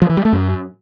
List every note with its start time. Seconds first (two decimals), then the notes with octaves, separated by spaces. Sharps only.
0.02 F3
0.09 E3
0.17 G3
0.25 A3
0.33 F#2